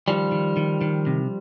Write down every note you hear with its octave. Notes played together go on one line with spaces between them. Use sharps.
D#3 F3 G3
D#3
D#3
D#3
C3